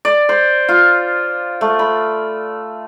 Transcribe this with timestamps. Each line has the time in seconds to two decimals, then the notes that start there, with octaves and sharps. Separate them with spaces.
0.05 D5
0.29 C5
0.68 F4
1.61 A3
1.79 B5